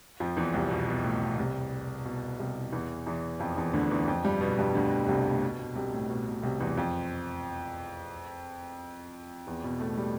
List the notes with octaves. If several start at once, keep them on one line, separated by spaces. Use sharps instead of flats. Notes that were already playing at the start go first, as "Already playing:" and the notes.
F2 F3
E2 E3
C2 C3
B2
B2
A2
B2
C2 C3
B2
C2 C3
E2 E3
E2 E3
F2 F3
E2 E3
D2 D3
E2 E3
F2 F3
G2 G3
B2 B3
G2 G3
D2 D3
C2 C3
A2
B2
B2
C2 C3
A2
B2
B2
C2 C3
E2 E3
F2 F3
E2 E3
B2 B3
A2 A3
G3